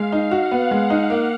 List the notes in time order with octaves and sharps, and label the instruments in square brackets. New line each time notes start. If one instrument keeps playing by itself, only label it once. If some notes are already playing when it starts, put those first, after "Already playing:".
Already playing: [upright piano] G#3 [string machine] F5
[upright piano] D#4
[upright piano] F#4 [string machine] F#5
[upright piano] B3
G#3
D#4
A#3